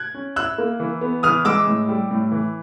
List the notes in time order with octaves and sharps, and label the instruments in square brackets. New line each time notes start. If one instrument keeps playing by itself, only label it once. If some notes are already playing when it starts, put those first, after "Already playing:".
Already playing: [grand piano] F#6 G#6
[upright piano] C#4
[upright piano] E4 [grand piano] E6 F#6
[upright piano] A#3
E3
B3
[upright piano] E3 [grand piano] D#6 F6
[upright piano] G#3 [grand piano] D6 E6
[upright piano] A2
G3
A2
E3